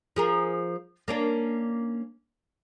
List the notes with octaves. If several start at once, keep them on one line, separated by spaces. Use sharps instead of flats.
F3 G#4 A#4
A#3 C#4 D4